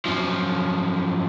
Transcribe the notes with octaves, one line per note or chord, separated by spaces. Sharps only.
F#2 F3